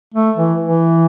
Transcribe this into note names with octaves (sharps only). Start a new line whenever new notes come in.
A3
E3
E3